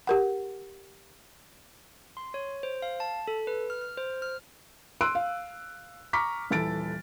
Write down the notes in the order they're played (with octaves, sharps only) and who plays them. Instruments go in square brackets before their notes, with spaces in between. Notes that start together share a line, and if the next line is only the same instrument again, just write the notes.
[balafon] G4 A#4 F#5
[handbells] C6
C#5
C5
F5
A5
A4
B4
F6
F6
C5
F6
[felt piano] C6 E6 F#6 D7 D#7
F5
A#5 C#6 D6 F6 B6
D#1 E3 A4 A6 D7